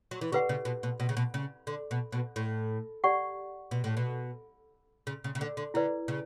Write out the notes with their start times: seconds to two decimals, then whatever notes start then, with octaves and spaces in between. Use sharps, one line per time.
0.11 F#3
0.21 E3
0.32 D3 G4 B4 F#5
0.49 C#3
0.65 B2
0.83 B2
1.00 B2
1.09 C#3
1.17 B2
1.34 C#3
1.67 D3
1.91 B2
2.12 B2
2.36 A2
3.04 G4 D5 F#5 C#6
3.71 B2
3.84 A2
3.97 B2
5.07 C#3
5.24 C#3
5.35 C#3
5.41 D3
5.57 D3
5.74 D3 E4 B4 D5
6.08 C#3